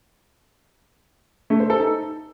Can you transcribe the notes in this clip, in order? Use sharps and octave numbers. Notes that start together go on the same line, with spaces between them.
A3
C5
A4
D#4